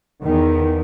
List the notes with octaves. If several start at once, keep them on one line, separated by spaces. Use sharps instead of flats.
E2 D#3